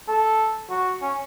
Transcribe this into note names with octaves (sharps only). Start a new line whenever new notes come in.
A4
F#4
C#4